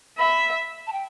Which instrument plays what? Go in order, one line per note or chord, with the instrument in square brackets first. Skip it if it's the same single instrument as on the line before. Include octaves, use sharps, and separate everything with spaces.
[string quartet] E5 [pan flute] B5
[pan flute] A5
G5